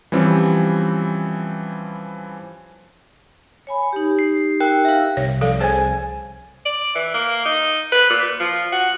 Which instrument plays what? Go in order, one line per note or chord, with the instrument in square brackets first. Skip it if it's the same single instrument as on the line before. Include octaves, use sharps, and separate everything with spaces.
[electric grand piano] E3 F3 G3 C4 C#4
[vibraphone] C#5 G#5 B5
D#4 G4
[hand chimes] C7
A#4 G5 F#6
E5 F5
[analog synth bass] C2 [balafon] C#5
[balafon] F3 A4 F5
[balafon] G#4 C5 C#5 [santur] G#5 A5
[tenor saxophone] D5
E3
A#3
D#4
B4
A#2
F3
F#4